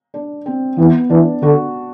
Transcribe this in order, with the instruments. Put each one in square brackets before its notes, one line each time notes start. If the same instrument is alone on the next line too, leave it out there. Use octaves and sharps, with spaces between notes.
[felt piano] D4
C4
[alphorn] E3 [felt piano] B3
[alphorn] E3 [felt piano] D4
[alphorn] D3 [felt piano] F#4